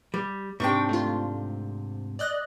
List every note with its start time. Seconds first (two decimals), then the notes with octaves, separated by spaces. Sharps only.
0.14 G3
0.60 G#2 C3 D4 G5 C#6
0.89 A3 F4
2.19 D5 D#5 F#6